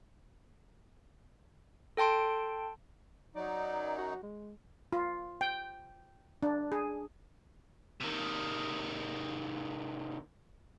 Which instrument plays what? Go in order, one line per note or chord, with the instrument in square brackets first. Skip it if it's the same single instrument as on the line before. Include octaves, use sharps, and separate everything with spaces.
[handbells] A4 G5 A5 C6 D7
[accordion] F#2 F#3 D#4 [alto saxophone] D5
[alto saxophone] F#4
G#3
[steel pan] F4
G5
D4
G#4
[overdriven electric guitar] C3 D#3